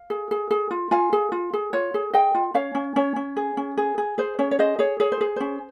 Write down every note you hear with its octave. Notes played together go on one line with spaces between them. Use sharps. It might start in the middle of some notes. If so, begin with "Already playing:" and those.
Already playing: F5
G#4
G#4
G#4
F4
F4 F5 G#5
G#4
F4
G#4
F4 C#5
G#4
G#4 D#5 G5
F4
C#4 C#5 F5
C#4
C#4 C#5
C#4
G#4
C#4
G#4
G#4
G#4 C5
C#4 C#5
C#5
G#4 C5 D#5
G#4 C#5
G#4 C#5
C5
G#4
C#4 C5